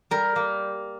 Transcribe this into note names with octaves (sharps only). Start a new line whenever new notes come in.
G3 A#4
A#3